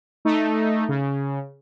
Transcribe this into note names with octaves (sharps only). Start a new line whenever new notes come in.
A3 D#4
C#3